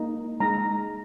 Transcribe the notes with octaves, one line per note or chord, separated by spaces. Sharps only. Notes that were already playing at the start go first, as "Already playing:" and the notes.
Already playing: A#3 D#4
G#3 D#4 A#5